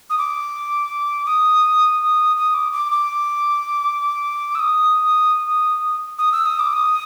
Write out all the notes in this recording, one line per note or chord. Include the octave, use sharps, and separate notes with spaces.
D#6
D6
D#6
D#6
D6
D6
D6
E6
D#6
D#6
E6
D#6
D6
D#6